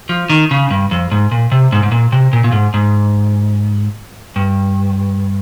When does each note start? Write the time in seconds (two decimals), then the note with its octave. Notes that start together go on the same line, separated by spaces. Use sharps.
0.09 F3
0.30 D#3
0.51 C#3
0.70 G2
0.91 F2
1.12 G#2
1.32 A#2
1.52 C3
1.72 G#2
1.83 G#2
1.92 A#2
2.12 C3
2.33 A#2
2.44 A#2
2.52 G#2
2.74 G#2
4.36 G2